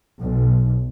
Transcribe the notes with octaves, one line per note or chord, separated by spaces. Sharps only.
B1